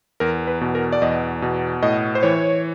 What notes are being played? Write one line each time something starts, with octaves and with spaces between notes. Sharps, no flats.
E2 A#4
B4
B2
A#4
D5
E2 D#5
B2
A2 D#5
C5
E3 C#5